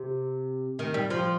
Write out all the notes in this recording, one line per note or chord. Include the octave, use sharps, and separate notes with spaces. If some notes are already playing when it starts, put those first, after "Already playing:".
Already playing: C3
D#3
G3
F3